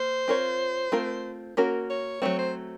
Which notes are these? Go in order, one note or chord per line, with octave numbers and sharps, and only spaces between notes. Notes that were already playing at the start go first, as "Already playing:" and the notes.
Already playing: A#3 C5
C4 F4 A#4 C#5
A3 C4 F4 A#4
A#3 C#4 F#4 A#4
C#5
F#3 A3 C4 C#5
C5